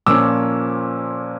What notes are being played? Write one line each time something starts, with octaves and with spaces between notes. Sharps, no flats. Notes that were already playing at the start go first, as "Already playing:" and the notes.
A#2 F3 A#3 C#4 D6 E6